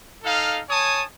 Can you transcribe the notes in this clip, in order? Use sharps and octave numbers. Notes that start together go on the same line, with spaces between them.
D#4 A4 F5
C#5 G#5 A5 D#6